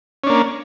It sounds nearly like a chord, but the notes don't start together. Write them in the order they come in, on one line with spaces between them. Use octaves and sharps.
C#4 D4 A#3